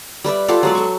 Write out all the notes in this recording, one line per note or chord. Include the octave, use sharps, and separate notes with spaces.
G3 B4 D5 E5
F4 G4 A4 F#5
F#3 G#3 D5
A4 C#6